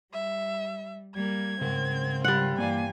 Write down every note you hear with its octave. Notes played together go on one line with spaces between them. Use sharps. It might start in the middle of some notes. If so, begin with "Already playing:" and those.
G3 E5
G3 A#3 G#6
G#2 C#3 C4 A#4
G3 F4 F#5
G2 E3 A#3 D5 F5 G#5